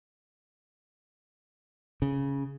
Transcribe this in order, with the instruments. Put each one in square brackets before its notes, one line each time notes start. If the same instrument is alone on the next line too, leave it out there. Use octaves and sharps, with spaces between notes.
[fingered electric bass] C#3